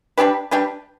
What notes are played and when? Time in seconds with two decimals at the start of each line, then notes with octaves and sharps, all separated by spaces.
0.18 G3 D4 G4 B4
0.51 G3 D4 G4 B4